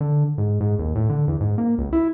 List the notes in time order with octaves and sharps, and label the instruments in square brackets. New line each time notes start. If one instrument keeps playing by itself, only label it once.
[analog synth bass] D3
G#2
G#2
D#2
A2
D3
E2
G#2
A#3
C#2
E4